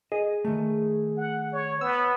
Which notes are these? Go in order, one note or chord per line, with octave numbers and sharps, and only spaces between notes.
G#4 D#5
D#3 A3
F#5
C#5
B3 E6